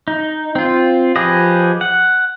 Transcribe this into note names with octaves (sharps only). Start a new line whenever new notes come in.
D#4
C4 F4
F3 G4 G#4 B4 D#5
F#5